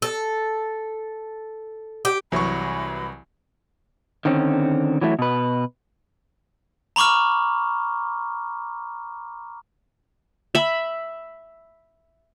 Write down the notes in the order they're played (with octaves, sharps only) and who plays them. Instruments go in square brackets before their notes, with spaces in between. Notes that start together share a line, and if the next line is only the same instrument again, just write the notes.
[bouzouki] A4
G4
[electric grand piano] C2 C#6 [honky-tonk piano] E3 F#3 [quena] B5
[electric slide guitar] D3 D#3 C4 C#4
E3 F#3 A3 E4
B2 B4
[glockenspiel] A#5 B5 C#6 D6 F6
[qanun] E5 B5